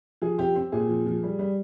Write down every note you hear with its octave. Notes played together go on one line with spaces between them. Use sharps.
F3 G#4
C4 G4
C4
A#2 G#4
F3
F3
G3
G3